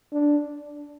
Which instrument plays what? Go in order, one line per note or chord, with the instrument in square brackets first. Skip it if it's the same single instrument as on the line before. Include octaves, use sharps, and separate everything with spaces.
[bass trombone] D4